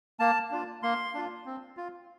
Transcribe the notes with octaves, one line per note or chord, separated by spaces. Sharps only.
A#3 A5
D4 F4
A#3 C6
D4 F4
C4
F4